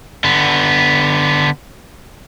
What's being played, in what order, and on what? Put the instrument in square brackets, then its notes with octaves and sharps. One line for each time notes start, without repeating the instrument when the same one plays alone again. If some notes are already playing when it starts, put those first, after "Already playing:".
[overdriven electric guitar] D3 B3